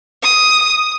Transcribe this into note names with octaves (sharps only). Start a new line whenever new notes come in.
D#6